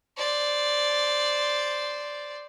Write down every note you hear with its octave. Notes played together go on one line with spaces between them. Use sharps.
C5 D5